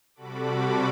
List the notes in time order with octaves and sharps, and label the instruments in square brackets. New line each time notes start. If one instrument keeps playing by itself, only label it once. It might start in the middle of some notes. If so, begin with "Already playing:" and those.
[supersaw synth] C3 G3 F#4 A4 B5 D6